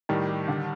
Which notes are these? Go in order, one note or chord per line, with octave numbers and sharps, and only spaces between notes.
A2 D#3 G3
G4
D3